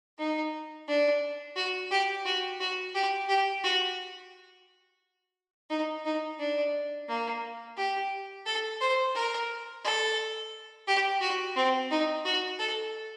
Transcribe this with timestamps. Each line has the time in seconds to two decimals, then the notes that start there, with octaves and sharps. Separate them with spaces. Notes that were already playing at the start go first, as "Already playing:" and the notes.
0.18 D#4
0.88 D4
1.56 F#4
1.91 G4
2.25 F#4
2.60 F#4
2.94 G4
3.29 G4
3.64 F#4
5.70 D#4
6.05 D#4
6.39 D4
7.08 A#3
7.77 G4
8.46 A4
8.81 C5
9.15 A#4
9.84 A4
10.87 G4
11.21 F#4
11.56 C4
11.91 D#4
12.25 F#4
12.59 A4